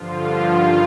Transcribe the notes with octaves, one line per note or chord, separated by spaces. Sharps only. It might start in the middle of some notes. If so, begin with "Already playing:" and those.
Already playing: G2 D3 F3 F4
G2 D#3 F4